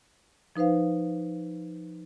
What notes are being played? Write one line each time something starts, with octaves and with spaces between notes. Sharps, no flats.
F3 D#4 B4 C5 F5